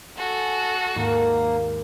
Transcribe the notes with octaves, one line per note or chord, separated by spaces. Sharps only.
F#4 A4 G#5
D#2 G#2 A#3 A#4